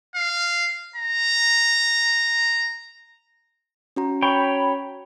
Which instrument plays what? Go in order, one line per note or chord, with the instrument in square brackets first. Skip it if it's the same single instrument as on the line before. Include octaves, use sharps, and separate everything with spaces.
[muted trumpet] F5
A#5
[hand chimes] C#4 F#4 A#5
[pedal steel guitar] C#5 G5 [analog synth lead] B5